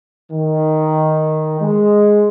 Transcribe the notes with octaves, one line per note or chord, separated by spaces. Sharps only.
D#3
G#3